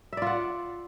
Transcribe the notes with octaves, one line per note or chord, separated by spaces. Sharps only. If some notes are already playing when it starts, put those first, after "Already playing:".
F4 D5 E5 F#5